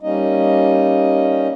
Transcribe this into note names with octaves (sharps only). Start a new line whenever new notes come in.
G3 A#3 C#4 D#4 D#5